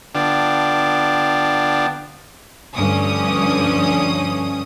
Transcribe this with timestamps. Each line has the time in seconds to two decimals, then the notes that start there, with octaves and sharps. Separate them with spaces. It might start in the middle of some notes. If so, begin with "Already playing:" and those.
0.15 D3 B3 D4 F4 G5 A5
2.75 D2 G2 F3 C#4 D#6